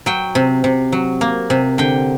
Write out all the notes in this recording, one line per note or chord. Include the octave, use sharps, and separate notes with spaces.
F#3 G5
C3
C3
F#3
A#3
C3
D3 G5